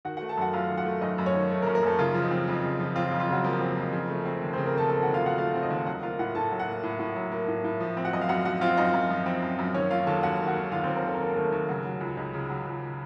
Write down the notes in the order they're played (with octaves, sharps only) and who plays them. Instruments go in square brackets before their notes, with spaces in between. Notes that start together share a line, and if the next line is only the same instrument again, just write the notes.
[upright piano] D#3 F#4 F#5
F#4 F#5
A3
A4 A5
F#2 F#4 F#5
F#2 F4 F5
D#3
F#4 F#5
A3
F#2 D#4 D#5
F#2
C#4 C#5
D#3
A3
A#3 A#4
F#2
A#3 A#4
F#2 A3 A4
C#3 F4
F3
D#4
C4
F2
C#3
F3
C4 F4
F4
F2
F4
C#3 F#3 F#4
F3 A#3 A#4
C4
F2
C#3
A3
C4
D#2
C4 C5
C#3
A#3 A#4
A3 A4 A5
C4 A4 A5
F#4 F#5
D#2
F4 F5
C#3 F#4 F#5
A3 F4 F5
C4
D#4 D#5
D#2
F#3 F#4 F#5
A#3 F4 F5
A2 F#4 F#5
A2 A4 A5
F#3
F#4 F#5
A#3
A2
A2
F#3
A#3
A2
A2
F3
C4
F#4 F#5
F#2 D#5
F5
F#2 F#4 F#5
F3 F#4 F#5
C4 F4 F5
F#2 D#4 D#5
F#2
F3
C4
F#2
F#2
D#3 C#4 C#5
A#3 F4 F5
D#2 A4 A5
D#2 F#4 F#5
D#3
F#4 F#5
A#3
D#2 F4 F5
C4 C5
D#2
A#3 A#4
D#3 A4
A#4
A#3 A4
A#4
D#2 A3 A4
D#2
C#3 F#3 F#4
F#3
C#2
C#2 D#4
C#3
F#3
C#2